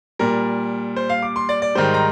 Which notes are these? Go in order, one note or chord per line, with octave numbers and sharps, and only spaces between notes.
A#2 G3 A#4
C5
F5
D6
C6
D5
D5
G#2 D#3 G3 C5
A#5